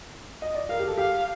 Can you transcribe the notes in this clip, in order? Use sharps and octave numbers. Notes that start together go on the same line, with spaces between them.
D#5
D5
A#4 F5
G4
A4
G4 F5